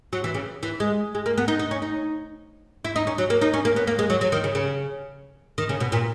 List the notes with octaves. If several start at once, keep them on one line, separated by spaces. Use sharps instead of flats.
F#3
E3
C#3
E3
G#3
G#3
A#3
B3
D#4
D#4
C#4
D#4
E4
D#4
C#4
F#3
A#3
D#4
C#4
A#3
B3
A#3
G#3
F#3
F#3
D#3
C#3
C#3
D#3
C#3
B2
A#2